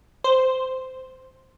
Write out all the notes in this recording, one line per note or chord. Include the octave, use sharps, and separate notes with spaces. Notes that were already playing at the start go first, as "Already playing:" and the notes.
C5